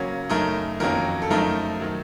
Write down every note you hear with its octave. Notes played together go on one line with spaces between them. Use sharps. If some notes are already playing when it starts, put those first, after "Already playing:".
Already playing: C#3 F#3 A#3 C#4
F#2 C#3 A3 D#4 A#4
F2 D#3 F#3 A#3 C#4 A#4
A4
F#2 F3 A3 D#4 A#4
D#3 F#3